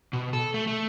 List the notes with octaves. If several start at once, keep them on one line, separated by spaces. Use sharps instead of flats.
B2
A4
A3
A3